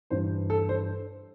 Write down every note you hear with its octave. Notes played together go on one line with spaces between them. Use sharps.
G2 E3 C5
A4
C5